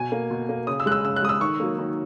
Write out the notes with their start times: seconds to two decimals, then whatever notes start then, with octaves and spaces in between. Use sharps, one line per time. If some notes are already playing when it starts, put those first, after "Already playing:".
Already playing: B2 G#5
0.12 A#3
0.31 B2
0.49 A#3
0.67 C#3 D#6
0.80 E6
0.86 G#3 F#6
0.92 E6
1.05 C#3 E6
1.16 F#6
1.23 G#3 D#6
1.29 E6
1.41 D#3 C#6
1.60 F#3 A#3
1.78 D#3